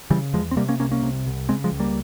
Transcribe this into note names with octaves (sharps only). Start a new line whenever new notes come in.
C#3 E3 G3
E2 F3 G#3
C4
C3 G3 A#3
A#3 C#4
C2 A#3 C#4
A#3 C#4
C3
C2
C#3 G#3 C4
F3 G#3
C#2
G3 A#3